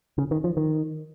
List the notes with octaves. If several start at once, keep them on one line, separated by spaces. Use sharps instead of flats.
C#3
D#3
F3
D#3